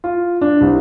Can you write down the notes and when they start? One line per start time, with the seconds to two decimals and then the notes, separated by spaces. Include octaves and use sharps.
0.04 F4
0.41 D4
0.61 C2